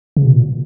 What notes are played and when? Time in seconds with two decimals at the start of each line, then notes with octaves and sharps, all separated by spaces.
0.17 C#3
0.25 B2
0.33 A#2